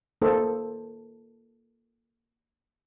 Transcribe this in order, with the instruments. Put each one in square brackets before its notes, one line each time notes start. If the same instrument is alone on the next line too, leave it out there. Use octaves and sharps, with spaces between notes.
[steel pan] A#3 D#4 A4 C5